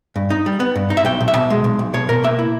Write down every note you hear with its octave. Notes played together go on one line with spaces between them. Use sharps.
G2
D#4
G3
B3
G2
D#4
E5
B1 G5
B1
E5
B2
G#3
B1
B1
B2 C#5
B2 A#4
A#3 E5
E4